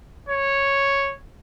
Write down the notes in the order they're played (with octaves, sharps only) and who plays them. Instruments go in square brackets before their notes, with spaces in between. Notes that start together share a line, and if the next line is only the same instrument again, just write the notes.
[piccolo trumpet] C#5